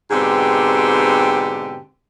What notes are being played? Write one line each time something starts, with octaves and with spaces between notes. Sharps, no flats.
G#2 B2 D3 C4 G4